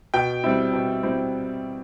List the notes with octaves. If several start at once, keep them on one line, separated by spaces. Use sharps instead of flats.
B2 G5
G3 C4 E4
B2
G3 C4 E4